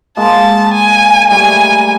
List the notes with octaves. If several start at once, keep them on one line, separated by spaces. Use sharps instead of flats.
G#3 A#3 A5
G#5
G3 A3 G#5